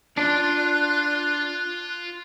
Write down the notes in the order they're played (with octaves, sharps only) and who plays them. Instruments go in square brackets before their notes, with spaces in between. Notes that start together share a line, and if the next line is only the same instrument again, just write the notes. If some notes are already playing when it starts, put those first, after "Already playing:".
[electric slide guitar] D4 D5 [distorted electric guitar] F4 C6 [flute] F#6